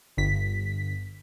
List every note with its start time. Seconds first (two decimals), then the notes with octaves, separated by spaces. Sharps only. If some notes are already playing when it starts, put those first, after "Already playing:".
0.17 G1 B6